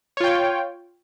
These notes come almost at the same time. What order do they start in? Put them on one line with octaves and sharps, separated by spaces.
C#5 F4 G5